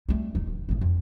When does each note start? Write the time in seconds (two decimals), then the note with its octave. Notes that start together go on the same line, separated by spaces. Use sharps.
0.09 G3 A3
0.35 D#1 D#4
0.47 D1 C#2
0.69 G#1 A2
0.81 F2